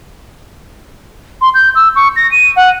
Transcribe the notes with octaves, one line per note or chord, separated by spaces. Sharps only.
C6
G6
E6
C#6
A#6
D#7
F#5